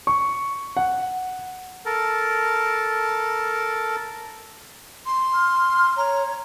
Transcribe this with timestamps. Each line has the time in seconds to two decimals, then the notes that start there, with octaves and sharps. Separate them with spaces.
0.07 C#6
0.77 F#5
1.86 A4 A#4
5.05 C6
5.34 F6
5.97 C#5 A#5